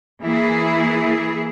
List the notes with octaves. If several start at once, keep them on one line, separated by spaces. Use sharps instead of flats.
E3 A#3 E4 G#4